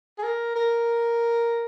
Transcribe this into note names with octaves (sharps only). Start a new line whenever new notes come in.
G#4
A#4
A#4